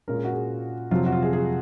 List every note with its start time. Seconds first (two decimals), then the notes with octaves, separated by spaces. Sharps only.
0.08 A#2 G#3 C#4 A#4
0.16 G#4
0.24 F#4
0.33 G#4
0.91 F2 C3 F#3 C4 F4
1.06 F#4
1.12 F4
1.23 G#4
1.33 G#4